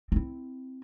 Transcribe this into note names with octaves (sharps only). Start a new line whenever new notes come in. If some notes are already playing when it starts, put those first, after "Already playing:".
C4 E4